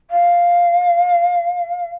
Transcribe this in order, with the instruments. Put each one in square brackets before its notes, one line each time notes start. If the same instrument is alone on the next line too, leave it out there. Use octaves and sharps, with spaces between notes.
[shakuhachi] F5